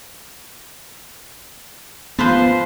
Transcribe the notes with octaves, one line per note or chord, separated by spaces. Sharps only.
F3 B3 B4 C5